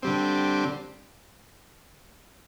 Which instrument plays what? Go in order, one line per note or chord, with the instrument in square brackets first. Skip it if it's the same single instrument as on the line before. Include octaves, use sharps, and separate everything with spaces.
[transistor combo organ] D3 G3 C4